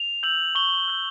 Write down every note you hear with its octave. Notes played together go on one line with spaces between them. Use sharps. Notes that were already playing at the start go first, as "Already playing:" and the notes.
Already playing: F7
E6 G6 F#7
C#6 G7
E6 G6